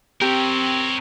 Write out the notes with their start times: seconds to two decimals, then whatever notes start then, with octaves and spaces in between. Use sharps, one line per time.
0.21 C4 G4 A#4 C#5